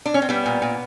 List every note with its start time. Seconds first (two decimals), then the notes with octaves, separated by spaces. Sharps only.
0.06 D4
0.14 C#4
0.22 C4
0.29 G3 B3
0.46 A#2
0.62 A#2